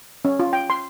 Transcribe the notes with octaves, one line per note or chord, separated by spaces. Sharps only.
C#4
F4
G5
C6